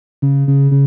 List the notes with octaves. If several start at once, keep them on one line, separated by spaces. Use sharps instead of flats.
C#3
C#3
C#3